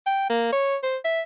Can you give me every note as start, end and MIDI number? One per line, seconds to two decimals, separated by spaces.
0.06 0.28 79
0.30 0.51 58
0.52 0.76 73
0.83 0.97 72
1.05 1.21 76